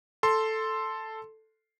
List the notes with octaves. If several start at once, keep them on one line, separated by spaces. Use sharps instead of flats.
A4 C6